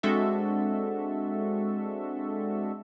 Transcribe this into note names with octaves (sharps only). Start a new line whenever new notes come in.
G#3 C4 D4 F#4 A4 E5